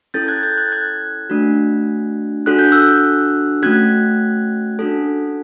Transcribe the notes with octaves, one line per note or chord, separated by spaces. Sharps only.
C#4 E4 A4 G6 A6
F#6 G#6
G6 A6
F#6 G#6
F#6 G#6
A3 D4 F#4
D4 F#4 A4 F#6
G6
E6 F#6
A3 C#4 F#4 F#6 G#6
D4 F#4 A4